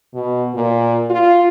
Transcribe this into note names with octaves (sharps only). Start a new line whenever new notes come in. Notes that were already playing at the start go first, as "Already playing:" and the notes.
B2
A#2
F4